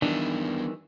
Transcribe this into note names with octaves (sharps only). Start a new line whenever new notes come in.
D#3 E3 G3 B3 D4 F4 G#4